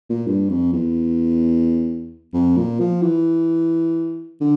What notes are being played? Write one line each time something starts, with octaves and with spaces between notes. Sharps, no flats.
A#2
G2
F2
E2
F2
A#2
F3
E3
D3